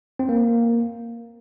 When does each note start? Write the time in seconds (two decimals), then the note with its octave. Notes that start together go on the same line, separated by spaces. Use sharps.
0.19 C4
0.29 A#3